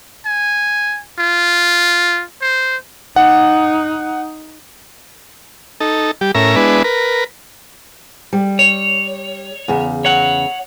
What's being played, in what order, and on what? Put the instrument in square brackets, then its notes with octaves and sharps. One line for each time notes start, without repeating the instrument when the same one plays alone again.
[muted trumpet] G#5
F4
C5
[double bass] D#4 [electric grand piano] F#5
[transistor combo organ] D#4 A4
G3 G4
A2 C#4 A#4 E5 A#5
G#3 B3 D4 E4 B4
A#4 B4
[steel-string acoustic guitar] G3
[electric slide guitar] C#5
[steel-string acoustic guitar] E2 C#3
[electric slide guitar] C#5 F#5